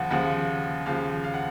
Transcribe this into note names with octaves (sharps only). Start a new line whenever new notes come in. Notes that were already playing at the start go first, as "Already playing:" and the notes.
Already playing: D#2 C#3 F3 F#5
D#2 C#3 F3 F#5
D#2 C#3 F3 F5
F5
F#5